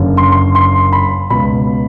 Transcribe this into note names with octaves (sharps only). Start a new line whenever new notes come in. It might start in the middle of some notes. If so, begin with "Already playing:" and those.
Already playing: F#1 F#2 D3
C6
C6
C6
B5
C#2 B2 B5